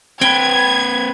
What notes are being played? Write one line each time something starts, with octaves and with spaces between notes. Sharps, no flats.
C4 B4 G5 G#6